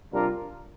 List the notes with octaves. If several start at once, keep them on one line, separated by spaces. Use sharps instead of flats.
C3 G3 D4 F4 A#4